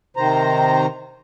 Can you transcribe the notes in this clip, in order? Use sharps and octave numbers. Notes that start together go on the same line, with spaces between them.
C3 D#3 C5 A#5